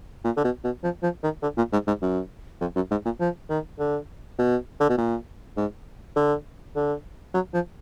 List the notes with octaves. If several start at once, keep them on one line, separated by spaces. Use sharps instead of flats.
A#2
D3
B2
B2
F3
F3
D#3
D3
A#2
G#2
G#2
F#2
F2
F#2
G#2
A#2
F3
D#3
D3
B2
D3
B2
A#2
G#2
D3
D3
F#3
F3